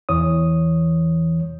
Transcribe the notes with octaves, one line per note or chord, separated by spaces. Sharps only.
E2 E3 C#5 D#6